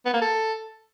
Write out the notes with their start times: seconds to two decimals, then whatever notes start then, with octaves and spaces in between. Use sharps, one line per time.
0.05 B3
0.13 A#3
0.21 A4